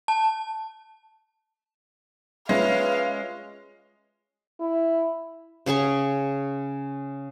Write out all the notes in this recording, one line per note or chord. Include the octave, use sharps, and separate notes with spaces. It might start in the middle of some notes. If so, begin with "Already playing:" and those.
A5
G#3 C#4 F4 B4 E5 F5
E4
C#3 C#4 G#4 C#6